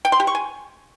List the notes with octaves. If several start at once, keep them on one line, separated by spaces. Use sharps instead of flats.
G5
C6
G4
C#6
G#5